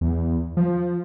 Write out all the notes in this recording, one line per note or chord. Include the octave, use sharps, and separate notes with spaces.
E2
F3